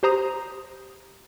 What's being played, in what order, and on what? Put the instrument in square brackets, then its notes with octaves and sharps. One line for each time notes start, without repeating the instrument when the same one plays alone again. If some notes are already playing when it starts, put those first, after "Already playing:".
[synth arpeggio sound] G4 C5 A#5 D#6